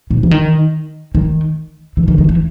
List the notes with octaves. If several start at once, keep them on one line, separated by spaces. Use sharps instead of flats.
B2
E3
D#3
D#3
E3
D#3
D#3
E3